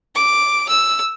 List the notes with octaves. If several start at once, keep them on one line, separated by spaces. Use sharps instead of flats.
D6
E6